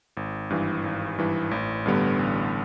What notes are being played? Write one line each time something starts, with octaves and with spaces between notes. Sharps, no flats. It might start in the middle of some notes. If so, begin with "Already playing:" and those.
G#1
G2 E3
G#1
G2 E3
A1
G2 D3 G3 B3
A1